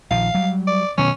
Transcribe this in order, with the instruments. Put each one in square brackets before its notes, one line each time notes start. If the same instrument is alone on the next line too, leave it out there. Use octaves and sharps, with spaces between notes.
[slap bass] A#1 D#3 F3 [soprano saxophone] F5
[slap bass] F#3 G3
[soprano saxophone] D5
[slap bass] B2 D#3 F#3 [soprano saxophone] C#4